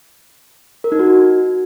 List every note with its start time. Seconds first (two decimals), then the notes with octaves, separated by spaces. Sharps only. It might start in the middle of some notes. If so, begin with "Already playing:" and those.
0.84 A#4
0.92 D#4
0.99 F#4